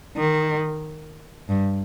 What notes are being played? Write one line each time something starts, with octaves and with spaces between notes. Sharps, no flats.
D#3
G2